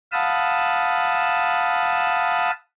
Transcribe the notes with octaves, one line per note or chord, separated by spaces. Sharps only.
F5 F#5 A5 B5 D#6 E6